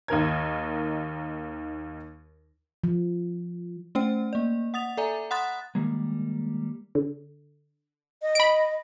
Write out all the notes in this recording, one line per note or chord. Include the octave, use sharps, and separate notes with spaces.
D#2 D#4 A#4 G#6
F3
A3 C#4 C5 G5
A#3 D5
F#5 D#6 A6 F7
A4 D5 E5 G#5 A#5
F#5 B5 C6 D#6 F#6 A6
D#3 G3 G#3 A#3
D3
D#5
B5 D7